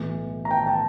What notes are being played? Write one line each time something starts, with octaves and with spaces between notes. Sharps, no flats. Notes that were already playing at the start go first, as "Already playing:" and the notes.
Already playing: B1 A2 E3
A#5
G5 A5
G5 A5